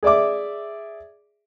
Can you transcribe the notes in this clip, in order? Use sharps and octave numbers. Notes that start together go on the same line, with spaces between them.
G#4 D5 E5 D6